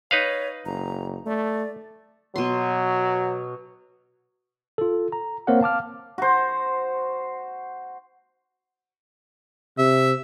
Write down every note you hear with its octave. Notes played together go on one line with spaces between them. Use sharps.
D#4 B4 C#5 F5
F#1 A#5
A3 D5
B2 F#3 C6
F4 A4
A#5
A#3 C4 A#4 C5 C#5 F#5
F5 A5 D6 F6
F#4 C5
C3 E5